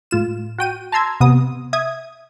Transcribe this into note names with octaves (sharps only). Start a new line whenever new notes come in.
A2 F4 E7
F#4 G5 D#7
A5 A#5 C6 E6 G#6
C3 B3 D#6
E5 D#6 G#6